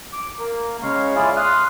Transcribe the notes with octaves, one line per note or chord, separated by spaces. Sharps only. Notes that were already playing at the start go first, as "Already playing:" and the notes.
D6
A#3
C#3 G#3 C#5 F5
C#4 E4 F4 G#4 D5 F5
C6 D#6 F6 F#6